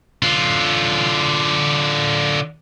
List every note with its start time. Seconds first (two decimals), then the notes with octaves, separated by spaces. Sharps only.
0.23 D3 F4